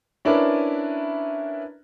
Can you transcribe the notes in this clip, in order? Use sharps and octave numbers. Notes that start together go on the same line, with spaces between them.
C#4 D4 E4 A#4 B4 D5